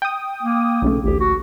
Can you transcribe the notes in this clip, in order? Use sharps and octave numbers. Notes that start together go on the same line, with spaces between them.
G5 D#6
A#3
B1 C#3 A3
A1 D2 G4
F#4